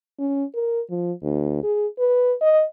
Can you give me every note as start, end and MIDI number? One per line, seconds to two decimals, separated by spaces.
0.19 0.44 61
0.55 0.81 70
0.90 1.12 53
1.23 1.59 38
1.63 1.87 68
1.99 2.34 71
2.41 2.64 75